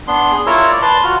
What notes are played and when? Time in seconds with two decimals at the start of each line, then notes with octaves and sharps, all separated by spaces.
0.08 B3 D4 C6
0.32 G#4
0.46 E4 F4 A#4 C#5 E6
0.69 D5
0.82 B4 A5 C6
1.04 F4 F#4 F6